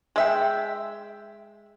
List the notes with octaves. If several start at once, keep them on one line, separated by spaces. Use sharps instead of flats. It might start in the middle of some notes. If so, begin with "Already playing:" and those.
G#3 E5 G5